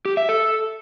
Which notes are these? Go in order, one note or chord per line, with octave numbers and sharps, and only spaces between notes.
G4
E5
A4